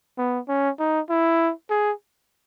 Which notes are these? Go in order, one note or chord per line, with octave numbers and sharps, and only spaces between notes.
B3
C#4
D#4
E4
G#4